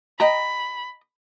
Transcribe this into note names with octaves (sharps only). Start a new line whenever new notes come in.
D#5 G5 A#5 B5